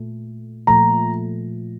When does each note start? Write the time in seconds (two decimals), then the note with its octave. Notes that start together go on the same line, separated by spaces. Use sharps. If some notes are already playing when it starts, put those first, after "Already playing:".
Already playing: A#2 A3
0.67 A#2 F3 A3 A#5